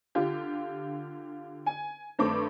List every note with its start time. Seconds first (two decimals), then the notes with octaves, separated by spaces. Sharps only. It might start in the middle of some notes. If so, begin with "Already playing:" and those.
0.15 D3 F4 G4
1.66 G#5
2.19 G2 D#3 A3 C4 C#6 D6